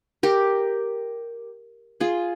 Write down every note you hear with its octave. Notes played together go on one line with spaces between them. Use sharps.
G4 A#4
F4 G#4